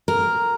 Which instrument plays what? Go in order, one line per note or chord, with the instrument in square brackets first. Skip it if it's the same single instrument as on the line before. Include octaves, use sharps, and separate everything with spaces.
[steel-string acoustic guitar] A#4